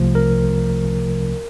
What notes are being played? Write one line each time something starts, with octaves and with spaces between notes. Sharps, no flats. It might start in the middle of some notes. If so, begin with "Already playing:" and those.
Already playing: C2 C3 F3 A3
A#4